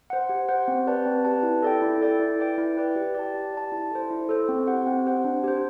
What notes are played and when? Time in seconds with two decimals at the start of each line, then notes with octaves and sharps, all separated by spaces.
0.10 C5 F#5
0.29 G4
0.48 C5 F#5
0.68 C4
0.87 G4 B4 D5 A5
1.06 C4
1.25 G4 B4 D5 A5
1.43 E4
1.62 A4 D5 G5
1.82 E4
2.01 A4 D5 G5
2.20 E4
2.39 B4 D5 G5
2.58 E4
2.77 B4 D5 G5
2.96 G4
3.15 D5 A5
3.34 G4
3.53 D5 A5
3.72 E4
3.91 A4 C5
4.10 E4
4.29 A4 C5
4.49 C4
4.67 G4 C5 F#5
4.86 C4
5.05 G4 C5 F#5
5.24 D4
5.44 G4 C5